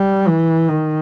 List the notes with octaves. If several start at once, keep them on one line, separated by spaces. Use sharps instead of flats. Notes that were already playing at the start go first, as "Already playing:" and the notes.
Already playing: G3
E3
D#3